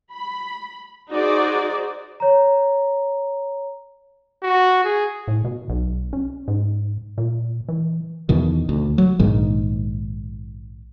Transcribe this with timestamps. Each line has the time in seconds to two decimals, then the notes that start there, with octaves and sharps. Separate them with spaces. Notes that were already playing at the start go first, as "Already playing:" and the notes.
0.13 B5
1.10 D#4 F#4 G#4 C5 D5
2.20 C#5 A#5
4.43 F#4
4.84 G#4
5.28 A2
5.45 B2
5.69 B1
6.13 C#4
6.48 G#2
7.18 A#2
7.69 E3
8.29 E2 B2 D#3
8.69 D2
8.98 F#3
9.19 A#1 G#2 D#3